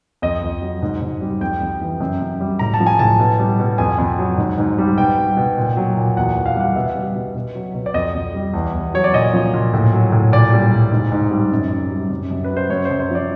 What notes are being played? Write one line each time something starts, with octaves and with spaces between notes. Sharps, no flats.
F2 D#5
F2
F#3
G#2
G#2
G3
F2 G5
F2
E3
F#2
F#2
G3
A2 A#5
A5
F3
G#5
A2 A5
B2
G3
B2
F2 G#5
F2
F#3
G#2
G#2
G3
B2 G5
G3
B2
A#2
F#3
A#2
E2 F#5
E2
F5
G3
F#5
B2 E5
G3
B2
B2
F#3
B2
D5
F2 D#5
F2
G3
E2
E2
F#3 C#5
D5
A#2 D#5
F3
A#2
A2
F#3
A2
A#2 D5
G3
A#2
G#2
G#2
G3
F#2
F#2
G3
F#2
F#2
B4
F#3
C5
F#2 C#5
C5
F#2
C5
F3 D5